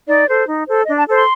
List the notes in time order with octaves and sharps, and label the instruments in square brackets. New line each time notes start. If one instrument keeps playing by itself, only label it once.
[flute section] D#4 D5
A4 C5
D#4
A4 C5
D4 D#5
A5
A4 C5
C6